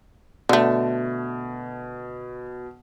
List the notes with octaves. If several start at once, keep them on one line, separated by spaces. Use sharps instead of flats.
B2 D3 A3